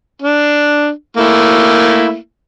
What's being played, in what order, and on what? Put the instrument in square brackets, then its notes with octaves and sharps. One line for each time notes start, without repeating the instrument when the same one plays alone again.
[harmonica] D4
A3 A#3 E4